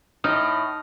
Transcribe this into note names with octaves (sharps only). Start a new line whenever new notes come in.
A2 D#4 D#6 F6